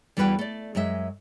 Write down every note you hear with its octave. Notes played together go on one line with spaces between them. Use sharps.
E2 G3 E4 F#4 B4 G5
A3 D5
F#2 G#3 D#5 E5